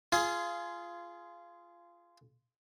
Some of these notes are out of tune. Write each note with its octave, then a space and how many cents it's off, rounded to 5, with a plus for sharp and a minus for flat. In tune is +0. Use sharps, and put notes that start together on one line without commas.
F4 -15 G#4 +15